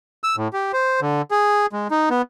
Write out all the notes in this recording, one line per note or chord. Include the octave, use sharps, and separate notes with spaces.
E6
A2
G4
C5
D3
G#4
G#3
D#4
B3